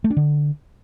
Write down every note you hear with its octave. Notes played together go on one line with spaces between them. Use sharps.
A3
D4
D3